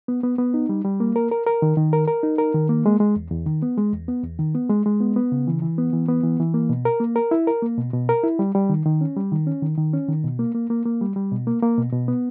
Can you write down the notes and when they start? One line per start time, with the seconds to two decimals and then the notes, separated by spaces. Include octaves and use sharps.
0.08 B3
0.23 B3
0.38 B3
0.54 D#4
0.69 G3
0.85 G3
1.00 A#3
1.16 A#4
1.31 A#4
1.47 A#4
1.62 D#3
1.77 D#3
1.93 A#4
2.08 A#4
2.23 D#4
2.38 A#4
2.54 D#3
2.69 A#3
2.86 G#3
3.00 G#3
3.16 E2
3.31 E2
3.46 D#3
3.62 B3
3.78 G#3
3.93 E2
4.08 B3
4.24 E2
4.39 D#3
4.55 B3
4.70 G#3
4.86 G#3
5.00 B3
5.16 B3
5.32 C#3
5.47 E3
5.62 E3
5.78 B3
5.93 E3
6.09 B3
6.23 E3
6.40 E3
6.54 A#3
6.69 B2
6.85 A#4
7.00 A#3
7.16 A#4
7.31 E4
7.47 A#4
7.62 A#3
7.78 B2
7.93 B2
8.09 A#4
8.23 E4
8.39 G3
8.55 G3
8.70 D#3
8.86 D#3
9.01 C#4
9.16 G3
9.32 D#3
9.47 C#4
9.62 D#3
9.78 D#3
9.93 C#4
10.08 D#3
10.24 B2
10.39 A#3
10.55 A#3
10.70 A#3
10.86 A#3
11.01 G3
11.16 G3
11.31 B2
11.47 A#3
11.62 A#3
11.78 B2
11.93 B2
12.08 B3